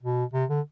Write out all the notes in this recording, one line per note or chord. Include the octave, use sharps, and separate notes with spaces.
B2
C3
D3